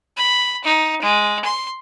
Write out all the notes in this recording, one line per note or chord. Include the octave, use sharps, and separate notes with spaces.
B5
D#4
G#3
C6